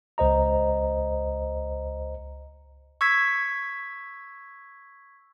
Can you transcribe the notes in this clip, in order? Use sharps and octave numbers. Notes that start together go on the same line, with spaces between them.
C#2 C5 D#5 A#5
C#6 E6 G#6 B6